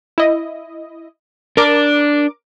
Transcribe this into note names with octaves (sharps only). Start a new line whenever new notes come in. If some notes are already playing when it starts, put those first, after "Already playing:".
E4 D#5
D4 A#4 D6